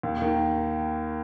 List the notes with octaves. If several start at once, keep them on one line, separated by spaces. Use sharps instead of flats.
D#2
D#3